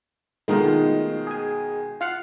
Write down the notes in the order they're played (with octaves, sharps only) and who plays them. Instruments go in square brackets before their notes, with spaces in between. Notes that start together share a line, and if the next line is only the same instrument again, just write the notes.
[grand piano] B2 D#3 G#3 [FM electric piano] A3 D#4 F4
[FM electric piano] G#4 G#5
F4 F5 F#5